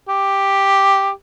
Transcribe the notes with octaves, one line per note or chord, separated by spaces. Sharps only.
G4